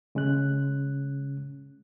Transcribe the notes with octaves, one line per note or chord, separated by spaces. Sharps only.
C#3 G#3 C#4 F#6